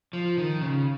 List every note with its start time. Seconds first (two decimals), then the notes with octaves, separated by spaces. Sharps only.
0.13 F3
0.38 D#3
0.61 C#3